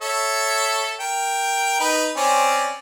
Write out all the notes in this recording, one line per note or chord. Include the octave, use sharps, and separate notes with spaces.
A4 C#5 E5
A#4 G5
D#4 B4
C4 C#4 D5